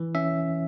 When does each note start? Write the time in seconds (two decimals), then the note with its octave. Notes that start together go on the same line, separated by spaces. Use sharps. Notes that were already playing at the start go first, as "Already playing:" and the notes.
Already playing: E3
0.15 C#4 E5